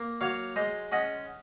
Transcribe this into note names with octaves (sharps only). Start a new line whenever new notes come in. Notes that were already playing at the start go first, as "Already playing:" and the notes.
Already playing: A#3
F#3 C#5 F5
G#3 C5 D#5
C#4 D#5 F#5